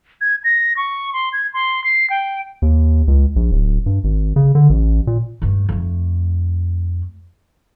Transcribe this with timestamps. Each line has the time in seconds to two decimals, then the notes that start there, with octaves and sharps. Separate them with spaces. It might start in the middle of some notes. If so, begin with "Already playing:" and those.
0.21 G#6
0.44 A#6
0.77 C#6
1.13 C6
1.33 G#6
1.54 C6
1.84 C7
2.10 G5
2.62 D#2
3.08 C#2
3.36 A#1
3.51 D1
3.86 G2
4.04 G#1
4.36 C#3
4.55 D3
4.70 A1
5.07 A#2
5.42 G2 A3
5.69 F2 A3